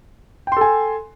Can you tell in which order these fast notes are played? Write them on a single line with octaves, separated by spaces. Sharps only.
G5 C6 A4 G#5